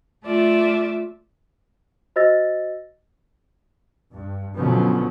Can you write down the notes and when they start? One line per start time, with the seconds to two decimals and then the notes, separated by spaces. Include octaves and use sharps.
0.25 A3 F4 D5 E5
2.16 F#4 C5 D#5 E6 A6 A#6
4.13 G2
4.55 B2 D3 F3 F#3 B3 C#4